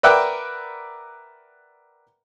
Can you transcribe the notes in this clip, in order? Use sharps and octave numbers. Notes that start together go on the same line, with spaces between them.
A#4 B4 D5 E5 F#5 G5